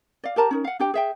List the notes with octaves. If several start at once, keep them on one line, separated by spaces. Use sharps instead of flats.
D5 F5
G4 A#4 A5 A#5
C#4 D#4 A#4
F5 F#5
D4 G4 G5
G#4 E5 G5